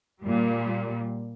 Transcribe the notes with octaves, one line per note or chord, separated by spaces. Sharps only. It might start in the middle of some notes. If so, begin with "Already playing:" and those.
A#2 G3